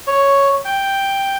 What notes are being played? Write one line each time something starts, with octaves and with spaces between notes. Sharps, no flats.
C#5
G5